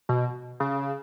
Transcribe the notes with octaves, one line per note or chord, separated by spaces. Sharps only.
B2
C#3